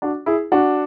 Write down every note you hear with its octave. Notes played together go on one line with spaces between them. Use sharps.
D4 F#4
E4 G#4
D4 F#4